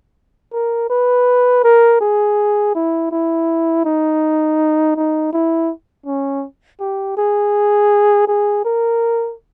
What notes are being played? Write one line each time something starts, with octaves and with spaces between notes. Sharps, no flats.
A#4
B4
A#4
G#4
E4
E4
D#4
D#4
E4
C#4
G4
G#4
G#4
A#4